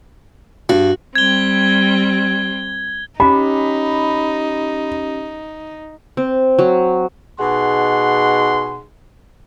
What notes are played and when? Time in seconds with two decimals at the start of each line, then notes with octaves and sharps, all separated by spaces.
0.69 G2 F#4
1.15 G3 C4 G#6 G7
3.20 C#4 D#4 G4 B5
6.17 C4
6.59 F#3
7.39 B2 D#4 G#4 F#5 C6